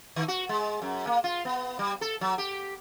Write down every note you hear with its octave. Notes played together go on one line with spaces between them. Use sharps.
D#3
F#4
G#3
F#2
A#3
F4
B3
G3
A4
F#3
G4